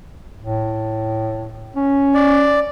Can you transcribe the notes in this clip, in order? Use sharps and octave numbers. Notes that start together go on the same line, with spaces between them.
A2
C#4
D5